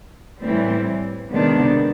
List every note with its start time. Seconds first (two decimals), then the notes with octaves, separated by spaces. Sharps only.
0.42 A2 E3 G3 C4
1.30 C3 D#3 G#3 B3 D4